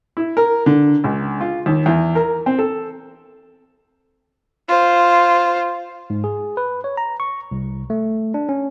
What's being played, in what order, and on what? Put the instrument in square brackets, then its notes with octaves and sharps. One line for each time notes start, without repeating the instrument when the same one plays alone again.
[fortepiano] E4
A#4
D3
C#2
F4
D#2
E2
A#4
C4
A4
[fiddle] F4 C5
[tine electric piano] G#2
G#4
B4
C#5
A#5
C#6
C2
A3
D4
C#4